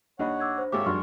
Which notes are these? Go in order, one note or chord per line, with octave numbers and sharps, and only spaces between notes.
D#2 D4 C#5 D#5 F#5 B5
D6 E6 G#6
C5
G#1 G#3 A#3 G4 C#5 E5 D6
F#2 D4 F#4 C6 C#6 F6